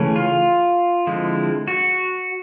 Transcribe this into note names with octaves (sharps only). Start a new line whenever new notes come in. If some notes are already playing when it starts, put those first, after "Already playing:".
Already playing: C#3 E3 A3 C#4
F4
D3 F3 G#3 C4 E4
F#4